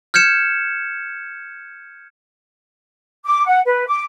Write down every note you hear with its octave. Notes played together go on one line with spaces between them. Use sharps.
F6 G6 G#6 C#7 E7
D6
F#5
B4
D6